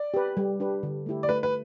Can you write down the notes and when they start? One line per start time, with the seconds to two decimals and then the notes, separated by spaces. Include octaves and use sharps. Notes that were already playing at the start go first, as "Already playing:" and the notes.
Already playing: D5
0.14 G4 B4
0.37 G3
0.60 D4 G4 B4
0.83 D3
1.06 A3 E4 G4
1.23 D5
1.29 A3 B4
1.43 B4